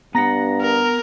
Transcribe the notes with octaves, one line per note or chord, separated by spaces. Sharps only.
G2 B3 F#5 A#5 A#6
A#4